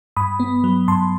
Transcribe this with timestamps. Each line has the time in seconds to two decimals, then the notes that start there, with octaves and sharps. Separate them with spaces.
0.16 G2 B5 D#6
0.40 B3
0.64 F#3
0.88 G2 A5 C6